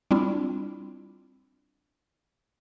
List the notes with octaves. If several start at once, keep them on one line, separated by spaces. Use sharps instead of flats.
G3 C4 D4 E4 F4